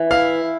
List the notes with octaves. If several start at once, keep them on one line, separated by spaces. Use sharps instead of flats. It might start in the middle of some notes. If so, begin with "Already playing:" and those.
Already playing: E3
E4 F5